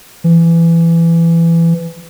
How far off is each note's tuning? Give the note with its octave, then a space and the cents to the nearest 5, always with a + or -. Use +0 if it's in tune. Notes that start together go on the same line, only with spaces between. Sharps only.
E3 +20